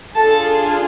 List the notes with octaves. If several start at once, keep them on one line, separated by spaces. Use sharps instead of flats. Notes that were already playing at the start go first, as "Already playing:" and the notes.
D4 F4 G#4 A4 A5